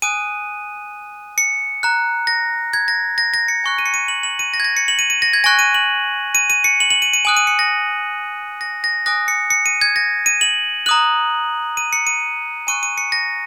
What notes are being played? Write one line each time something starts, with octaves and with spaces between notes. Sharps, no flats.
G#5 D#6 F#6 D#7
C#7
A#5 F#6
A#6
G#6
A#6
A#6
A#6
C#7
G#5 C#6 F#6
D#7
C#7
D#7
F#7
F#7
D#7
A#6
G#6
A#6
C#7
F#7
D#7
D#7
A#6
G#6
G#5 C#6 F#6 A#6
D#7
F#7
D#7
D#7
C#7
F#7
F#7
D#7
D#7
G#5 D#6 F#6 F#7
D#7
C#7
A#6
A#6
A#6
G#5 D#6 F#6 A#6
C#7
C#7
D#7
G#6
A#6
D#7
F#7
A#5 D#6 F#6 F#7
D#7
C#7
D#7
G#5 C#6 F#6 D#7
D#7
C#7
A#6